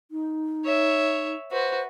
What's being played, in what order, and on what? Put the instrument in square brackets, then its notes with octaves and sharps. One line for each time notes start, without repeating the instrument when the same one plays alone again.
[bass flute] D#4
[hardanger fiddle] C#5 E5
[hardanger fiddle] F#4 B4 [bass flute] C5